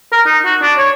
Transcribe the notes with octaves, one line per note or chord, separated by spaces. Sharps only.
A#4
D#4
F#4
D4
C#5